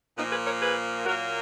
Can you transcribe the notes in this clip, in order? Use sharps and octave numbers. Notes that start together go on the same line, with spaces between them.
A#2 F3 A#3 B3 D#4
G#4 B4
A#4 C#5
G#4 B4
A#2 F#3 A#3 F#4 A#4